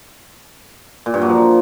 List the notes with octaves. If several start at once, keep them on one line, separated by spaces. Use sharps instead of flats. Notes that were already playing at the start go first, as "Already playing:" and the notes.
A#2
G2
F#3
F3